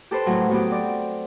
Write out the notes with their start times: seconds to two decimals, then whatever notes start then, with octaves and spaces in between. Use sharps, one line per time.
0.11 G4 A4 B4 C5
0.26 A2 F#3
0.50 F#3 B3 G4
0.71 C4 D5